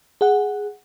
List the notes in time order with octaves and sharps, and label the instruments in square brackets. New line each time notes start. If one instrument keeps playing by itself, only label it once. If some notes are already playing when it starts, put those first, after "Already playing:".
[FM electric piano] G#4 F#5